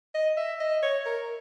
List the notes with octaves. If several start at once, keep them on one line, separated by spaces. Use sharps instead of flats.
D#5
E5
D#5
C#5
A#4